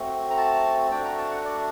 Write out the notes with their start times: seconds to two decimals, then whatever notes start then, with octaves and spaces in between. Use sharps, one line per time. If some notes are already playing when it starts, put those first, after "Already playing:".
Already playing: A3 C4 F#4
0.30 A#5
0.37 A5
0.91 A3 D4 F#4 G5
1.05 A#5
1.18 A5
1.31 F#5
1.45 D5